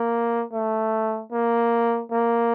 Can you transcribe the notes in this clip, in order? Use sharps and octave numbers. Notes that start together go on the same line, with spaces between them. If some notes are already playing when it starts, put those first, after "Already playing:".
Already playing: A#3
A3
A#3
A#3